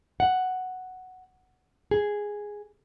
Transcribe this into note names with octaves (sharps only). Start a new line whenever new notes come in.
F#5
G#4